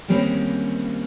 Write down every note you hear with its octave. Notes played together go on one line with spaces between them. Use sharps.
D#3 G3 G#3 A#3 C4 C#4